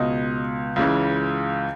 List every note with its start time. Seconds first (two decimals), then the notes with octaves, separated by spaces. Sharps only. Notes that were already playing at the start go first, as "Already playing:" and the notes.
Already playing: C#2 B2 D#5
0.76 C#2 C#3 E3